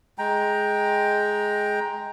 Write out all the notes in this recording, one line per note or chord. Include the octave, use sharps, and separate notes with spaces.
G#3 G5 A#5